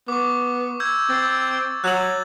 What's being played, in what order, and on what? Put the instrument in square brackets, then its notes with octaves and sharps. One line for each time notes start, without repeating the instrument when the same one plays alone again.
[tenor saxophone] B3 [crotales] C#6 D6
[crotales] E6 G6 G#6
[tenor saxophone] C4 [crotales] A6
[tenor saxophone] F#3 [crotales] F#6 F#7